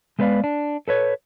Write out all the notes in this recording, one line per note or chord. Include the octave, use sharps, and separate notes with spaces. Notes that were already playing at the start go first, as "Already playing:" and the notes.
G#3 A3 B3 B4 D5 F5
D4
A4 B4 C#5